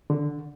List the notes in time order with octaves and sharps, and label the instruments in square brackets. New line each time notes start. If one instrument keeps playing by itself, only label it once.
[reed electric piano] D3